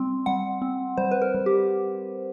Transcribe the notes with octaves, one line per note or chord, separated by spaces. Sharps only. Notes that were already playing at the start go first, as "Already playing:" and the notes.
Already playing: G3 C4 C6
G3 F#5
C4
G3 C5
B4
A#4
G3
G4